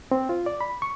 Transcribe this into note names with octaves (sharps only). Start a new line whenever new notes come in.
C4
F4
D5
B5
C#6